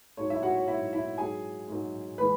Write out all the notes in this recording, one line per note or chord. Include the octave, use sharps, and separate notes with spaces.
G#2 F#3 C#5
E4 E5
F#4 F#5
C#5
G#2 F#3 E4 E5
E4 E5
G#2 F#3 G#4 G#5
G#2 F#3
E3 G#3 B4 B5